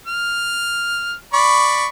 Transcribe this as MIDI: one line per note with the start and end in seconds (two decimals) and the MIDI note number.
0.07 1.13 89
1.33 1.86 74
1.33 1.86 83
1.33 1.86 85